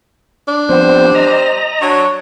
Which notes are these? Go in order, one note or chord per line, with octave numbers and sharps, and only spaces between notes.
D4
F3 G3 B3 C4 C5
D#5 A#5
F#3 D4 C#5